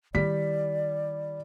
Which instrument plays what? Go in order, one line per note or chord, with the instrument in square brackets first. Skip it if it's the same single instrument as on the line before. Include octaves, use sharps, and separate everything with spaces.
[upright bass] D#3 E4 [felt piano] G3 B6 [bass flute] D5